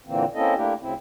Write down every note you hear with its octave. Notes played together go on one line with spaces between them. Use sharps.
A#2 D3 E3 A#3 C4
A#3 C4 C#4 E4 A4 D#5
A3 A#3 D4 E4 G4
D2 C#3 C4 E4